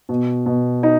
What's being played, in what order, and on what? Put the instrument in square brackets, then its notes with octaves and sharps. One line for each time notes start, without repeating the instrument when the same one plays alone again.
[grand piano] B2
B2
D#4